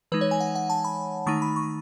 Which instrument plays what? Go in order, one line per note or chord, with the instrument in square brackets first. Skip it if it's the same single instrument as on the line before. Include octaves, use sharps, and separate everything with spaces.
[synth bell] E3 G#3 D#4 B4
C#5
G#5
F#5
F#5
A5
B5
D#3 A3 D#4 C#6
B5
C#6